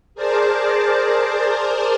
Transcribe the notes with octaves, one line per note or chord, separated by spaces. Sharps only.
G#4 A#4 C5 D5 A5